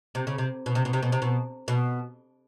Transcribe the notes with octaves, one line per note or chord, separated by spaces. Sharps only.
C3
C#3
C3
B2
C3
B2
C3
B2
C3
B2
B2